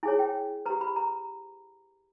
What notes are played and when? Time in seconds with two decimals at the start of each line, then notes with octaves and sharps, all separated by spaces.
0.03 E4 G#4 C#5 G#5
0.19 G5
0.66 G4 B4 A#5
0.81 B5
0.96 A#5